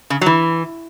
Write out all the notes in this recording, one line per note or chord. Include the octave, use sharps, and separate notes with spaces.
C#3
F#3
E3